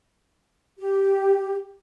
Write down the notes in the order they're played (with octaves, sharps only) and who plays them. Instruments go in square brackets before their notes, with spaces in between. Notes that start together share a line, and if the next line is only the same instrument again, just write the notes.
[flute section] G4